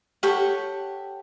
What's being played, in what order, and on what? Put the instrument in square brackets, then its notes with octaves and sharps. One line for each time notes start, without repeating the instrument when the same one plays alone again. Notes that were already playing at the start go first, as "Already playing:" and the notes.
[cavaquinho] G4 A4 C#5 F#5